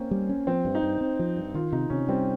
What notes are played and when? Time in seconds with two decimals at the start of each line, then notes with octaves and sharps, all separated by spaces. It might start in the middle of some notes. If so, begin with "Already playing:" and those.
Already playing: A#3 C4 C#4
0.11 G3
0.29 C#4
0.47 F3 C4
0.65 G2
0.75 D#4
0.83 G2
1.01 C4
1.19 F3
1.36 G2
1.54 D#3 F4
1.73 C3 D#4
1.90 C3 C#4
2.08 G3 C4